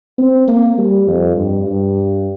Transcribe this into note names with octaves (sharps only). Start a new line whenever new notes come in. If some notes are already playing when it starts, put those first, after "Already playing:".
C4
A#3
G3
F2
G2
G2